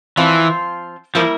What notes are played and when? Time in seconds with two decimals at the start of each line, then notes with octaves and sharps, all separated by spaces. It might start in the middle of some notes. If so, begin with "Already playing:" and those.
0.17 E3 F3 C4 F4
1.15 F3 G3 A#3 E4 A#4